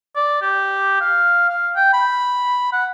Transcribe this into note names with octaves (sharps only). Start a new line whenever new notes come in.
D5
G4
F5
F5
G5
B5
F#5